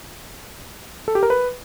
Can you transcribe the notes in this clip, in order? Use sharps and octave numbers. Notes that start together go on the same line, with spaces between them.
A4
G4
A#4
B4